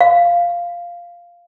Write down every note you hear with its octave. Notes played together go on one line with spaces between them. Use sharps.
F5